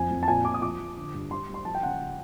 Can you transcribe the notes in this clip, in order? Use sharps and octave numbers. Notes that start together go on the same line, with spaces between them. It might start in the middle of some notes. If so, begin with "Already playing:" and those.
Already playing: F2 G#5
F2
A5
A#2 G#5
A#2 D6
D#6
F3 D6
F3
D3
G2
G3 C6
G3
C6
F3 A5
G5
C#3 F#5